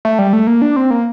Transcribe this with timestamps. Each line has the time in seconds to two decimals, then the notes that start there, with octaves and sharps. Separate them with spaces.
0.05 A3
0.19 G3
0.33 A3
0.47 A#3
0.62 D4
0.76 C4
0.91 A#3